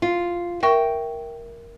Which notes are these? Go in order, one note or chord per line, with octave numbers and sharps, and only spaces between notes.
F4
A#4 E5 G5 C#6